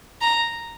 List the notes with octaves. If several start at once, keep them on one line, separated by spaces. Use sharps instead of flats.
A#5